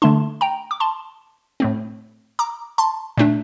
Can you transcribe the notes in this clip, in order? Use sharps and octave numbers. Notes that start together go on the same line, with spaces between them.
D3 A3 D4 A5 C6
G5 A#5
D6
A5 C6
A2 A3 C4
A#5 D6
A5 C6
A#2 A3 D4